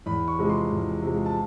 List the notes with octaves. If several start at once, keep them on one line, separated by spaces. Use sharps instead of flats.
E2 B5
C#6
C3 F3 G#3
C6
E2
C3 F3 G#3
A5